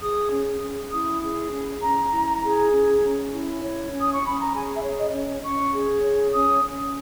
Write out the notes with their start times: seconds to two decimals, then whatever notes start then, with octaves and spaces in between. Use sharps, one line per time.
0.01 G#4 D#6
0.31 C#4
0.61 C#4
0.90 E4 D#6
1.21 G#4
1.51 C#4
1.81 C#4 A#5
2.12 E4
2.42 G#4
2.71 C#4
3.01 C#4
3.32 E4
3.63 C#5
3.93 C#4
3.99 D#6
4.12 C#6
4.23 C#4 B5
4.39 A#5
4.53 G#4 G#5
4.75 E5
4.82 C#5
4.98 D#5
5.13 C#4
5.43 C#4 C#6
5.73 G#4
6.03 C#5
6.33 C#4 D#6
6.64 C#4